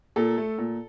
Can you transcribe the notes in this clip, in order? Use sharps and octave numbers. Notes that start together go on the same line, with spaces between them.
A#2 A4
A3
A#2